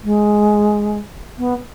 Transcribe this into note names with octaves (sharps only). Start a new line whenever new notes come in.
G#3
B3